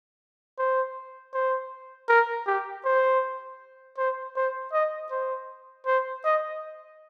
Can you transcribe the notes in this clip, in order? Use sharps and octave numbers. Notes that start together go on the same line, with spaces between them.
C5
C5
A#4
G4
C5
C5
C5
D#5
C5
C5
D#5